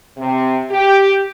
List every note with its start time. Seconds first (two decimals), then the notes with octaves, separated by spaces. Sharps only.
0.17 C3
0.70 G4